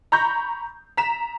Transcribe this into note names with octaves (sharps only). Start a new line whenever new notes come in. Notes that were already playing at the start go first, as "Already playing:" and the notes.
A#5 B5 C#6 G6 A#6
A#5 B6 E7